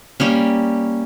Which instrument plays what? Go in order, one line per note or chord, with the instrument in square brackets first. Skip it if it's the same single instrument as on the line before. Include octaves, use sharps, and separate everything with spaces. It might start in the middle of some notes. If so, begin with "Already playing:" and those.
[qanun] G3 A#3 C#4